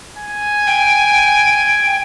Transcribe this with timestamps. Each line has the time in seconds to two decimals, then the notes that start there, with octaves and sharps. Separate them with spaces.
0.17 G#5
0.67 G5